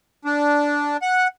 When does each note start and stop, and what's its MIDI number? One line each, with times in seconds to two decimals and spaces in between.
0.25 0.97 62
1.02 1.28 78